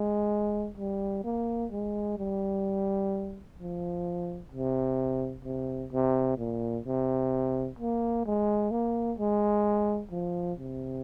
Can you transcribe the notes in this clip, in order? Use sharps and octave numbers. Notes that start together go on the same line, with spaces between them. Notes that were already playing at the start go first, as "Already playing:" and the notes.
Already playing: G#3
G3
A#3
G#3
G3
F3
C3
C3
C3
A#2
C3
A#3
G#3
A#3
G#3
F3
C3